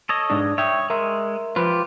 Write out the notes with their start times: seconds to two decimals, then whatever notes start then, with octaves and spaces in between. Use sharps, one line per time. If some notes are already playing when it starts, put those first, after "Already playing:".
0.09 A4 C#5 D#5
0.30 G#2 D4
0.58 C#5 E5 G5 D#6
0.90 G#3 A#4 E5 C6
1.56 F3 F4 G4 B4